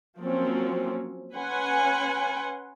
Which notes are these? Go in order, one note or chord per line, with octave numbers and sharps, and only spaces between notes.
F3 F#3 A#3 C4 C#4
C#4 B4 F#5 G#5 C6